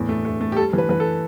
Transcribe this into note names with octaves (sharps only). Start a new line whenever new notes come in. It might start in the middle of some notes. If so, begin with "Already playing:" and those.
Already playing: E2 A2
A3
A3
A3
G4
G3 A4
E3
B4
E3 B4
A4